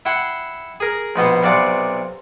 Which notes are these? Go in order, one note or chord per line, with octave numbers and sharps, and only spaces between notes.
E4 F#5 G5 C6
G#4 A#4
A#1 B2 B3 C5
B1 C3 D5 F5 F#5